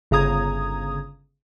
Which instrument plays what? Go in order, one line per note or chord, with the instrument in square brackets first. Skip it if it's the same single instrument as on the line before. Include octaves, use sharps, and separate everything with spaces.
[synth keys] G1 C#3 A#5 D#6 G#6